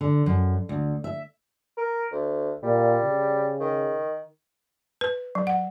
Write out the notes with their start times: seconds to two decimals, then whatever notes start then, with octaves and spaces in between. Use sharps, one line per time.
0.01 D3
0.26 F#2
0.69 D2
1.04 E5
1.77 A#4
2.12 D2
2.63 A#2 G3
3.03 C#3
3.60 D#3
5.01 B4
5.35 F#3
5.47 F#5